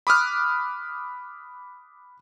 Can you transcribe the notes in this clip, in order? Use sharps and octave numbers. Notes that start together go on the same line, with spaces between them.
B5 D6 D#6 F6 F#6